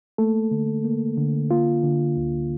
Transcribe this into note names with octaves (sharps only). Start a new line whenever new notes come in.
A3 A#3 A4
D3
A#3
D3
A#3 F4
D3
D2